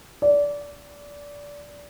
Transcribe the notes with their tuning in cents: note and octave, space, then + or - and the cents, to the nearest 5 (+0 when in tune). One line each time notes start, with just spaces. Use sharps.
D5 -20